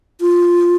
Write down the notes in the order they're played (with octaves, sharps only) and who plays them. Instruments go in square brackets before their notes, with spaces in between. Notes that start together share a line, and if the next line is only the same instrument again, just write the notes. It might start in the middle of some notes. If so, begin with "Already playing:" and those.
[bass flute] F4